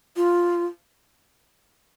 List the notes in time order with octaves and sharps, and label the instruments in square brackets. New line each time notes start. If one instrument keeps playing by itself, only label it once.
[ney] F4